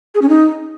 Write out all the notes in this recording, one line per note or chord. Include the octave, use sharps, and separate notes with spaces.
G#4
C#4
D#4